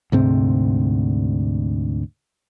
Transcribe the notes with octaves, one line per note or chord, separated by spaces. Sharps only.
D2 G#2 C3 C4